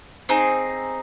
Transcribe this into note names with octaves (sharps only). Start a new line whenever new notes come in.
C4 D#4 G#4